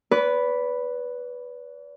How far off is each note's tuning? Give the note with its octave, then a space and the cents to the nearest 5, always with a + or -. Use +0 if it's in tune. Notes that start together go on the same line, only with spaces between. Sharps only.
B4 +0 D5 -40